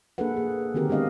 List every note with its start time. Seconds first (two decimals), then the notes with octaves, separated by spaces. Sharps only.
0.18 A#3 D4 G#4 A4 B4 F#5
0.37 G#4
0.74 D3 D#3 C4 F#4 G4 A#4
0.89 G#3 B3 D4 D#5 F5